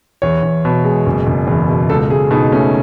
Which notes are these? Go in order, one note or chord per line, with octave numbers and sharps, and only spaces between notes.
E2 C#5
E2
B2
G#3
F#1
F#1
E2
B2
C#2 A4
C#2 G#4
B2 D#4
A3 C#4